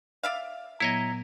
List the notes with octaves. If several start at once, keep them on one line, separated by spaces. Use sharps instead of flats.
D5 E5 F5
A#2 F#3 B3 E4 C#5 D#5 A#5